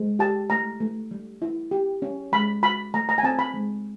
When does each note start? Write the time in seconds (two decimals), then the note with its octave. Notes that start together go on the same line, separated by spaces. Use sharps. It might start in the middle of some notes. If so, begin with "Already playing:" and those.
Already playing: G#3
0.19 G4 A5
0.50 A3 A#5
0.80 A3
1.11 G3
1.42 E4
1.71 G4
2.02 C#4
2.32 G#3 B5
2.63 F#4 B5
2.94 A3 A#5
3.09 A#5
3.18 G#5
3.23 C4 A5
3.39 B5
3.54 G#3